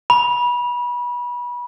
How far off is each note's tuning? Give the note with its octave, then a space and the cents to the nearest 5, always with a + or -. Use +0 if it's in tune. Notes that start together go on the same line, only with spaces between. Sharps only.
B5 -25